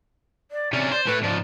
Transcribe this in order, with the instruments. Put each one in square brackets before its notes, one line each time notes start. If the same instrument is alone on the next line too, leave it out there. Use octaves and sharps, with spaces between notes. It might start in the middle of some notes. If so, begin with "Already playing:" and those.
[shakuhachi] D5
[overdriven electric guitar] C3 C#4 [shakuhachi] D5
[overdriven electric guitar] C5 [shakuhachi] D5
[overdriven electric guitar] A2 A3 [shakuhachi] B4
[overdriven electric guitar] G#2 F3 [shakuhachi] D5